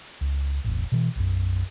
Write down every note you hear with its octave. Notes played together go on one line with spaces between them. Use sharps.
C#2
E1 A1
B2 E3
B1 F#2